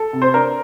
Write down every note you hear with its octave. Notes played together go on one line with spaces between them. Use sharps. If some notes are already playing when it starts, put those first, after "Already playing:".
Already playing: A4
C3
C5
D4 A#4